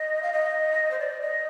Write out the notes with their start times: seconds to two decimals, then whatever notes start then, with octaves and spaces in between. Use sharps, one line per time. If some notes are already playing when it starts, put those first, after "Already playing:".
Already playing: D#5
0.23 F5
0.33 D#5
0.91 C5
0.99 D5
1.21 D#5